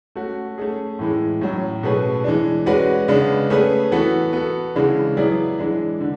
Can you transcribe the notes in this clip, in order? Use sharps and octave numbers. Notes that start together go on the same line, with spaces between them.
A3 C#4 F#4
A3 C#4 G#4
A2 E3 G#3
A2 F#3 C#4
B2 A3 C#4 G#4 B4
E3 G#3 D4
G#3 C#4 F#4 B4 D5
C#3 G#3 B3 D4
A3 C#4 G#4 B4
E3 B3 F#4 A4
B3 F#4 A4
C#3 E3 G#3 D4
F#3 B3 E4 G#4 D5
E3 G#3 D4
D3